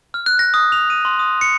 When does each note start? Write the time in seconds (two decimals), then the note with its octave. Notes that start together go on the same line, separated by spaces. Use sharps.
0.14 F6
0.26 F#6
0.39 A#6
0.54 D#6
0.72 F7
0.90 D#7
1.05 C6
1.19 D#6
1.41 C#7